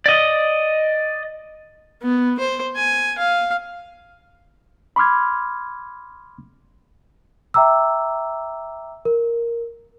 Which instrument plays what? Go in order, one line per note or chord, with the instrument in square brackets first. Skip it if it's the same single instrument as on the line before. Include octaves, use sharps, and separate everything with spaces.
[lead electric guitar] D5 D#5
[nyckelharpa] B3
C5
G#5
F5
[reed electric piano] B5 C6 D6 F6 G#6
[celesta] E5 G5 A#5 D6 E6
A#4